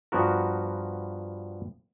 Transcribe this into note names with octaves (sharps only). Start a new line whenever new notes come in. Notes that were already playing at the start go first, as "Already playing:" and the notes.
G2 F3 B3 F#4 A#4